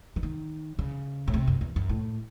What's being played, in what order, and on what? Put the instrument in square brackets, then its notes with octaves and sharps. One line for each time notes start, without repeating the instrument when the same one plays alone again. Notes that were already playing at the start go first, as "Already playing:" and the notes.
[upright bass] E3
D#3
C#3
A2
C3
F#2
E2
F#2
A2